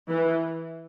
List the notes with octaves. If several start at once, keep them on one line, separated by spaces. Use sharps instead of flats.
E3